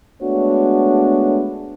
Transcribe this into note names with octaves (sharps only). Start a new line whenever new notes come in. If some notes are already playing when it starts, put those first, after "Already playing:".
G#3 A3 B3 D4 F#4 C#5